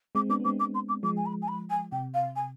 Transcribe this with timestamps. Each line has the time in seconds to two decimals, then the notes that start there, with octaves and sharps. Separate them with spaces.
0.15 G#3 C4 D6
0.29 B3 D4 D6
0.40 B3
0.44 G#3 C4 D6
0.59 D6
0.74 C6
0.89 D6
1.03 F3 G#3 D6
1.17 G#5
1.26 B5
1.42 G#5
1.48 B5
1.70 G#5
1.92 C3 G5
2.14 F5
2.36 G#5